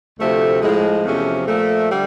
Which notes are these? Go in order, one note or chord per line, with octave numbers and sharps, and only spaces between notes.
D2 C3 F3 A3
A2 F3 G#3
E2 C3 F3 A3 C#4
A#2 F3 A3
D3 G3